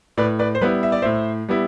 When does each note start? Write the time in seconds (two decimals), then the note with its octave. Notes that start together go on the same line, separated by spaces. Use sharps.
0.17 A2 B4 D5
0.39 B4 D5
0.55 C5
0.61 G3 B3 E4 B4
0.83 E5
0.92 D5
1.02 A2 C5 E5
1.49 G3 B3 E4